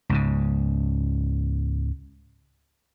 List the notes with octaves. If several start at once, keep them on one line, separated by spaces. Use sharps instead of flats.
C#2 G#2 C#3